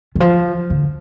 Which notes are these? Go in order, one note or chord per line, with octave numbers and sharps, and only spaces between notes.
D#3
F3
D3